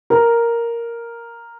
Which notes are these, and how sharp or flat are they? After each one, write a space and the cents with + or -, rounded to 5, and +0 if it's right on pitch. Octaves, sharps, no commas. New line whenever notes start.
A#4 +0